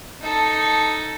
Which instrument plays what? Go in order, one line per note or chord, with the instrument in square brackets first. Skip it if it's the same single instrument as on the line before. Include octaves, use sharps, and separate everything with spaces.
[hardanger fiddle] D#4 A4